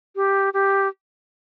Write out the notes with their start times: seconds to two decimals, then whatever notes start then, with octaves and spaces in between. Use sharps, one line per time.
0.16 G4
0.54 G4